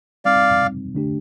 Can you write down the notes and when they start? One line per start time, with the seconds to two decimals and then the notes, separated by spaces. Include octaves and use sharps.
0.25 G3 C4 D#4 D5 F5
0.95 D3 A3 D4 G4